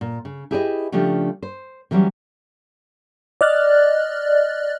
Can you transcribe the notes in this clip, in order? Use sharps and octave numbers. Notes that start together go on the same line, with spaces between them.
A#2
C#3
E4 G4 G#4 B4 D5 D#5
C#3 F3 A3 D4 G4
C5
D3 E3 F#3 G3 C#4
D5 D#5 F6 F#6 A6